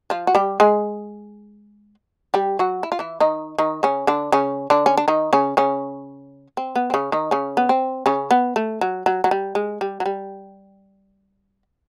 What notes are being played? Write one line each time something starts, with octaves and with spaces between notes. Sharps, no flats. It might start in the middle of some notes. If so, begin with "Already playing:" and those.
F3 F4
F#4
G3 G4
G#3 G#4
G3 G4
F#3 F#4
E4
F4
E3 E4
D#3 D#4
D#3 D#4
C#3 C#4
D3 D4
C#3 C#4
D3 D4
C#4
D4
D#3 D#4
C#3 C#4
C#3 C#4
C4
B3
C4
C#3 C#4
D#3 D#4
C#3 C#4
B3
C4
C#3 C#4
B3
A3
F#3
F#3
F#3
G3
G#3
G3
F#3
G3